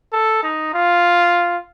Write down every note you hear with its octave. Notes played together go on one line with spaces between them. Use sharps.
A4
D#4
F4